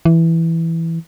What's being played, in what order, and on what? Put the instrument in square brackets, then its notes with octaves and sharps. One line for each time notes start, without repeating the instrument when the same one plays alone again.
[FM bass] E3